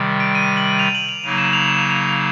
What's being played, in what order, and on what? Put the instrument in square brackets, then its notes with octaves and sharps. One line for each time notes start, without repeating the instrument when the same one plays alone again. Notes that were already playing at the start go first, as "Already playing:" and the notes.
Already playing: [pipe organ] C3 D#3 G3
[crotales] D7
D#7
F#7
F7
F#7
F7
[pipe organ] C#3 F#3 A#3 D#4 [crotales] F7
[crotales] E7
F7
E7
F7
F7